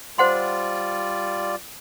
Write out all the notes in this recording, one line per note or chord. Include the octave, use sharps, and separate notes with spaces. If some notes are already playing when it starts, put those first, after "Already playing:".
G3 F4 C5 D5 F#5 C6